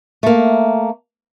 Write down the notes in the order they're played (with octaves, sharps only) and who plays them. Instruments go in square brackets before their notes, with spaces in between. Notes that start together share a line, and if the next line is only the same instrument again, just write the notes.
[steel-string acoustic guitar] A3 A#3